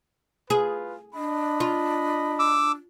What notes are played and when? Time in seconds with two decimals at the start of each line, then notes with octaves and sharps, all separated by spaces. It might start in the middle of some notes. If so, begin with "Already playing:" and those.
0.50 F4 G#4 B4
1.14 D4 D#5 B5
1.60 F4
2.39 D6 E6